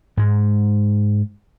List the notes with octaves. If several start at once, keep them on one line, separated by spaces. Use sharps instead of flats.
G#2 G#3